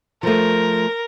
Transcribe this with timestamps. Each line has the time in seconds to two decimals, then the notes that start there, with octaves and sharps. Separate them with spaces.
0.23 F3 A3 A#4